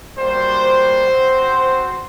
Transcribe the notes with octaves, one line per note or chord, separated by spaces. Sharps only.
G3 A#3 F#4 C5
C4 F#4